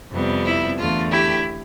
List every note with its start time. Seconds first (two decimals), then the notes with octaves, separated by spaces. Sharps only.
0.11 F2 C3 G3 B3
0.45 E4
0.77 E2 D3 A3 F4
1.11 E4 G4